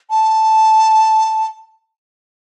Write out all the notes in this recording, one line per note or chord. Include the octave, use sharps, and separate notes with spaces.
A5